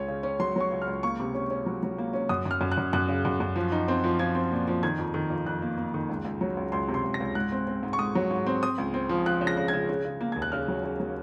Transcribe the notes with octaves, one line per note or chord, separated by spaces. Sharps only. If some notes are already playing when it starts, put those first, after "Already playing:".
Already playing: C#2 C#4 C#5
C#3
C#4
F#3 C6
F#3 C#6
C#2
F6
C#2
A#3 C#6
C3
C#4
C#4
F#3
F#3
A#3
C#4
F#2 D#6
F#2
F6
F#2
F#6
F#2
F#2 F#6
C#3
F#2
F#2
F3
D#4
C4
F3
F3 G#6
C4
A#2
F3
D#3 G#6
F2
D#3
F2
F2 F#6
A#3
A#3
D#3
C#2
C#2
F#3
C#2
C#2 C6
C3
C6
C#2
A#6
C#2
G#2 F#6
C4
C4
G#2
C#6
G#2 D#6
F#3
G#2
C4
C4 D#6
C#2
C4
F3
F3 F#6
C#3
A#6
C#3
G#6
C#3
C#3
C#3
A#3
D#2 G#6
F#6
C#3 F6
F#3
C#3
F#3